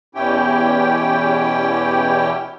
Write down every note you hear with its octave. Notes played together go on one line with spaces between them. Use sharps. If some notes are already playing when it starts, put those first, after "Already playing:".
E2 B2 C#4 E4 G4 G5